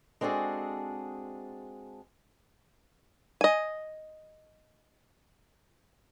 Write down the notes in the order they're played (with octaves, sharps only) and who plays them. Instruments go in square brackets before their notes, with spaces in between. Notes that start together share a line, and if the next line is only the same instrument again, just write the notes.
[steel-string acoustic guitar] G#3 C4 D4 F#4 G#4 A4
[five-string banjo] D#5 G#5